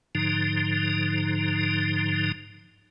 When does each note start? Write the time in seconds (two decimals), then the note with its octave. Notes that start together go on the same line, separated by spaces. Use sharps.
0.15 G#2 D3 F3 D#4